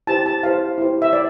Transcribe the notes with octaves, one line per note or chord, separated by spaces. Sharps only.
E4 G4 C5 A5
A5
E4 G4 C5 F5
E4 G4 C5
E5
E4 D5